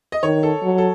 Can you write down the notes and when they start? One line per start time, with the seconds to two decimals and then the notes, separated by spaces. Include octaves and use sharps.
0.12 D#5
0.23 D#3 C#5
0.43 A4
0.63 F#3
0.78 A4